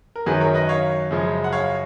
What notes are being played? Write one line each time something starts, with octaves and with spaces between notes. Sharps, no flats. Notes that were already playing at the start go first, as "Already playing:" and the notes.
A#4
F#2 D#3 F#3 G#4 B4
A#4 C#5
B4 D#5
C#5 F5
F#2 C#3 F3 G#3
F#5
C#5 F5